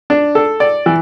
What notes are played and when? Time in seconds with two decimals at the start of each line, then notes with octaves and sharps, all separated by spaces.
0.10 D4
0.35 A4
0.60 D5
0.86 E3